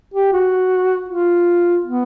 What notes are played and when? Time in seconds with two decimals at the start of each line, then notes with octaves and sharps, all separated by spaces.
0.14 G4
0.32 F#4
1.08 F4
1.84 B3